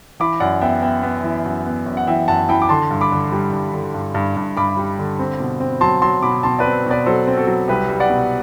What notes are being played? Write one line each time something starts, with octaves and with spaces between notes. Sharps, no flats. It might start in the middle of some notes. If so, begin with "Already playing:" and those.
E3 B5 D6
F#2 D5 F#5
B3 E5 G5
B3 E5 G5
B3
E3
F#2
B3
F#2
F#5
E3 E5 G5
F#2 F#5 A5
E3 G5 B5
D6
D3 A5 C6
G2
B5 D6
D3
G3
G2
D3
G2
G2
G2
G2 B5 D6
G3
D3
C4
B2
C4
F#3 A5 C6
F#3 A5 C6
B2 B5 D6
B2 A5 C6
B4 D5
C4
B2 B4 D5
F#3 A4 C5
C4
F#4 A4
F#3
C2 G4 B4
G3
D5 F#5
B2